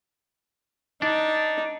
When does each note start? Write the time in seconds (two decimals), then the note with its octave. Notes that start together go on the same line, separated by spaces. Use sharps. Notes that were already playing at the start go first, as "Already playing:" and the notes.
1.02 D4 D#4